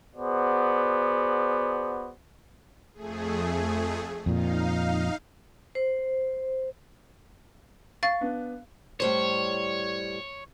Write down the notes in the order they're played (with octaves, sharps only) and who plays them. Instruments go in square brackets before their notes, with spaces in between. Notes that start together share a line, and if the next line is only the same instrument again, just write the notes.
[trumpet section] B3 F#4 G#4 C5 D5
[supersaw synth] F2 A3 G#4
[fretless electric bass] F2 A#2 [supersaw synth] D#4 F5
[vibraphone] C5
[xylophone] F5 A6 [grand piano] C#6
[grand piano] B3 D4
[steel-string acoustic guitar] A2 G3 C5 [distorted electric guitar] C#5